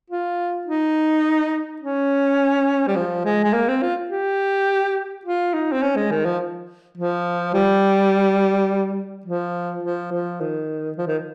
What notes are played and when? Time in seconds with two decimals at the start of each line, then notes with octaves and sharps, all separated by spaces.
0.10 F4
0.67 D#4
1.82 C#4
2.87 G3
2.96 F3
3.25 G#3
3.44 G#3
3.53 A#3
3.68 C4
3.82 F4
4.10 G4
5.25 F4
5.54 D#4
5.72 C4
5.82 C#4
5.96 G#3
6.11 D#3
6.25 F3
6.97 F3
7.54 G3
9.25 F3
9.83 F3
10.12 F3
10.41 D#3
10.97 F3
11.07 D#3